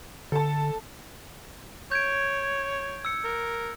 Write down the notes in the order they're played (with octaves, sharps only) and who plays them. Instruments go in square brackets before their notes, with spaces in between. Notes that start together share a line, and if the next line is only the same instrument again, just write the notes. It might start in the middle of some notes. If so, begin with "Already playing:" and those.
[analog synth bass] D3 [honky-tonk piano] A4 A5
[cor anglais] C#5 [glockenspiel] G6 G#6 D7
[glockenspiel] E6 C#7
[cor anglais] A#4